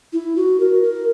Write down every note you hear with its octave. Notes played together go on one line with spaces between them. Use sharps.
E4
F#4
A#4
A#4